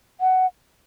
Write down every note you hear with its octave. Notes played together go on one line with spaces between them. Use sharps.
F#5